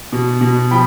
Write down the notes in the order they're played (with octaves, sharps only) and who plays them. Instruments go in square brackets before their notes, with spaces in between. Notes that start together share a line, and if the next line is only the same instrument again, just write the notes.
[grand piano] B2
B2
F3 G5 B5